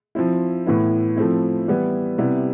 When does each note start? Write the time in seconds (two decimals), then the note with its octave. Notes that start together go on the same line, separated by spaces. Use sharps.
0.15 F3 C4 E4
0.66 A2 E3 B3 E4
1.16 F3 A3 C4 E4
1.68 E3 G3 B3 E4
2.18 C3 G3 B3 E4